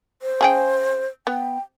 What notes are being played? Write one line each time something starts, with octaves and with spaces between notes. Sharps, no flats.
C5
C#3 G#4 G5
B3 G5